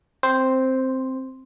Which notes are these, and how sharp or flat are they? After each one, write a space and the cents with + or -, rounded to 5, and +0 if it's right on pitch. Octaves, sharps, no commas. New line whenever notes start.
C4 +0 C5 +0